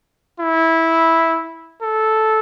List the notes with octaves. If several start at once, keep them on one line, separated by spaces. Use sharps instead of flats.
E4
A4